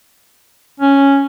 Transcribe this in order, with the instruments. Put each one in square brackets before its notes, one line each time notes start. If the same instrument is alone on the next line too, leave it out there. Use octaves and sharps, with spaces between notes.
[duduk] C#4